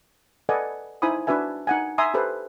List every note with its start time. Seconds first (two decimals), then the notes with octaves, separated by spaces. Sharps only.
0.49 A4 B4 D5 D#5 F#5 G#5
1.02 D#4 E4 C5 G#5 B5 D#6
1.27 D4 F#4 B4 E5 G#5
1.67 D#4 F#5 G#5
1.98 E5 G#5 A#5 C6 D#6
2.14 G4 A4 B4 C5